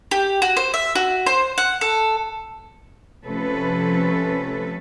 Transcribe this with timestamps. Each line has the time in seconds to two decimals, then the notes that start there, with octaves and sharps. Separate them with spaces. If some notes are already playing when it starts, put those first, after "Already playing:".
0.11 G4
0.42 F#4
0.57 C5
0.74 E5
0.95 F#4
1.26 C5
1.58 F#5
1.81 A4
3.25 C3 F3 A3 C#4 A4 B4